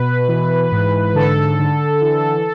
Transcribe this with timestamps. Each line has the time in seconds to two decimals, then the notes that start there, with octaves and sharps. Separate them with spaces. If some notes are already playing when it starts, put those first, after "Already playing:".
Already playing: B2 B4
0.28 E3
0.72 G#2
1.15 D3 A4
1.59 D3
2.02 E3